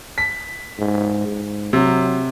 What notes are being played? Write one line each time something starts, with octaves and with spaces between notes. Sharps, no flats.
B6
G#2
G#2
C3 F#3